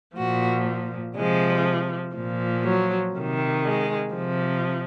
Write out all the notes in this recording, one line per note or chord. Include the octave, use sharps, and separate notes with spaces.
A#2 F3 F#4
C3 F3 G#3
A#2 F3
F#3
C3
D#3
G#3
C3 F3